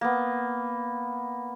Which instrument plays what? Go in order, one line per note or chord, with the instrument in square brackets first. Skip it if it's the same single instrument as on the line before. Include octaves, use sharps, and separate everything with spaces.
[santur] A#3 B3